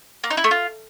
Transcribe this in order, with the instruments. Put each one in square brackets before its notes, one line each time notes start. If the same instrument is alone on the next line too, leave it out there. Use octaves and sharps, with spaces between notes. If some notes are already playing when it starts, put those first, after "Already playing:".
[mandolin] A#3
D#4
E4
A3
F4